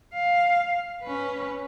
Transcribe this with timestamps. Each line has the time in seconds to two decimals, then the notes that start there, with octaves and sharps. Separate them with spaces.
0.14 F5
1.02 C#4 B4